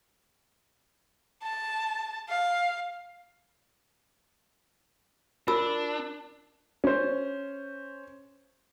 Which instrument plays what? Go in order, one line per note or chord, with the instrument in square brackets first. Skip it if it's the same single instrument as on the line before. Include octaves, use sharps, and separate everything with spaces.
[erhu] A5
F5
[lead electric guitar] D4 [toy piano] F4 A#4 E6
[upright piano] C#4 C5